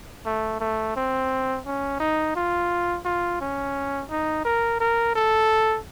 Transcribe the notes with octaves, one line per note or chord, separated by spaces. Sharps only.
A3
A3
C4
C#4
D#4
F4
F4
C#4
D#4
A#4
A#4
A4